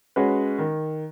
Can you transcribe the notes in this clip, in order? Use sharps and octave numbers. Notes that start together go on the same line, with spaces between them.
G#3 C#4 F#4 B4
D#3